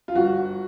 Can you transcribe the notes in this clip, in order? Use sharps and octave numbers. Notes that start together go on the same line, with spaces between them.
F4
G1 F#4